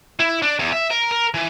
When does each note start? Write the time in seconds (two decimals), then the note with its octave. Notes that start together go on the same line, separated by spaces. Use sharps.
0.20 E4
0.43 D4
0.59 E2
0.72 E5
0.90 A#4
1.11 A#4
1.34 E3